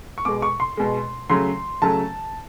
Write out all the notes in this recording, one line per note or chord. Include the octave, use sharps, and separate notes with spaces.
C#6
B2 G#3 D6
C#6
C6
B2 G#3
C#3 F#3 A3 C6
C#3 F#3 A3 A5